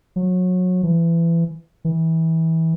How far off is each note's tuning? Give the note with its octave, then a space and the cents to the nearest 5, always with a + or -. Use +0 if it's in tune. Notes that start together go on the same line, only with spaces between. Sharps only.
F#3 -25
E3 +25
E3 -25